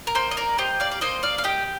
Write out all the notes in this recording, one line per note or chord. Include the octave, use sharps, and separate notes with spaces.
A#4
A#3 C5
D#5
A#4 D5
G4 C5 D#5
D5 F5
D5
A#3 C5 D#5
D5 F5
F5
G4 D#5 G5